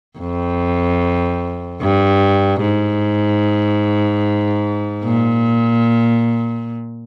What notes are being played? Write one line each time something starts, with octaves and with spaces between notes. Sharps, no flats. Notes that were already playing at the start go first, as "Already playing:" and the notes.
F2
G2
G#2
A#2